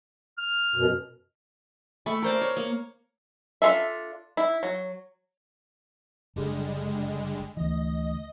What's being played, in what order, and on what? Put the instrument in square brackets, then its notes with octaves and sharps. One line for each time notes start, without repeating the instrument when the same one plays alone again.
[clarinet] F6
[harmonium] F#2 B2
[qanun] A3 B5 C#6
A#4 C5 D5
C#5
A#3
[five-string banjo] D4 F4 A4 E5
E4
F#3
[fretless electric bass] F#1 [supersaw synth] D3 G3 G#3
[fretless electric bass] D2 E3 [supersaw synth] D#5